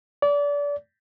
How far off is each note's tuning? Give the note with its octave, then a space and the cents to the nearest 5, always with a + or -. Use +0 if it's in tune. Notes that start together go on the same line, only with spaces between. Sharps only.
D5 -30